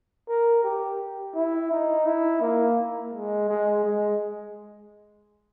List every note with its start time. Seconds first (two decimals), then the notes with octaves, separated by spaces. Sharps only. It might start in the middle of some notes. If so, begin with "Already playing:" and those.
0.28 A#4
0.64 G4
1.35 E4
1.71 D#4
2.06 E4
2.41 A#3
3.13 G#3
3.49 G#3
3.84 G#3